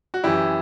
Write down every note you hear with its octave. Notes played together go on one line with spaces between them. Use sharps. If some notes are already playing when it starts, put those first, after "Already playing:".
F#4
F#2 E3 E4 G4